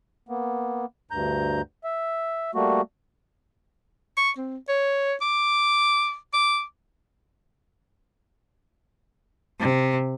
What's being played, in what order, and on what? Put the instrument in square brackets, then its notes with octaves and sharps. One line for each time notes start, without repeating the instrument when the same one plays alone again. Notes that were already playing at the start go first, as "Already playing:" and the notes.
[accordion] A#3 B3
D2 G2 A#5 G6
E5
G3 A3 A#3 F#4
[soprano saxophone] C#6
C4
C#5
D6
D6
[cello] C3